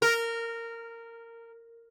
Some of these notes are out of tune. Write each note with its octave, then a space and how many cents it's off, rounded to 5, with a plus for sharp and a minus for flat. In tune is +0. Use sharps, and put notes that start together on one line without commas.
A#4 -15